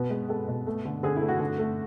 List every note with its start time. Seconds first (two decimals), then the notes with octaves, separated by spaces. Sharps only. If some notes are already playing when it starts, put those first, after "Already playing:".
Already playing: B2 B4
0.10 G#3
0.29 G#3 A4
0.48 B2
0.67 A3
0.85 D3
1.03 D3 G#4
1.16 E4
1.21 A3
1.28 F#4
1.40 D3
1.58 A3